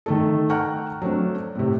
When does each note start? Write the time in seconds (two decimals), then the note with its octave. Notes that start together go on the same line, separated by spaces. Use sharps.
0.06 D#3 A3 A4
0.50 F#5 G5 A#5 C#6 F6 F#6
1.02 F#3 A3 C4 D4
1.55 A2 C3